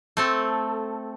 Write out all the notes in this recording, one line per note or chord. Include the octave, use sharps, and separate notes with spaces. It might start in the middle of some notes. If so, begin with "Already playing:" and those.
A3 C4 A4